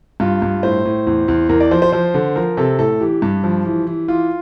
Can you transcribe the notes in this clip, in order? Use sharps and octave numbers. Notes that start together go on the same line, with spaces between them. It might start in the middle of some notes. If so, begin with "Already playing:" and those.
G2 F4
G2
A2 C5
A2
E2
E2
E2 A#4
D5
F3 C5
C5
F3 C5
D3
F3 A#4
C3 A4
A2 A4
E3 G4
G2
F3
E3
E3
E3 F4